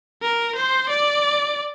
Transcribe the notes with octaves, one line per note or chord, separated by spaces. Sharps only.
A#4
C5
D5